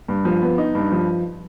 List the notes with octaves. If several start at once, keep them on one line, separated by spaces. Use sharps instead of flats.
G2
F3
B3
D#4
G2
F3